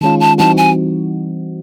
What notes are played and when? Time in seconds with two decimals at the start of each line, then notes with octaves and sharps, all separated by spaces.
0.01 D#3 G#3 C#4 F4 A5
0.20 A5
0.38 E3 G3 C4 D#4 F#4 A5
0.57 G#5